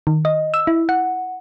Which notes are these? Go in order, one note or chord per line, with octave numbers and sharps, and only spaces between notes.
D#3
D#5
E6
E4
F#5